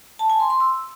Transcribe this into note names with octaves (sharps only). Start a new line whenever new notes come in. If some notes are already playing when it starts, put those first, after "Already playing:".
A5
G#5
C6
C6
E6